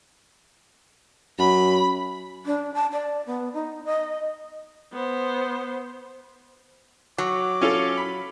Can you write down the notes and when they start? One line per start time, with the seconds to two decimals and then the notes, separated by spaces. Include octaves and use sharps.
1.39 F#2 B5
2.46 D4
2.74 A5
2.92 D5
3.26 B3
3.54 D#4
3.85 D#5
4.93 B3 C5
7.18 F#3 D6
7.61 C#4 F4 A4
7.97 B5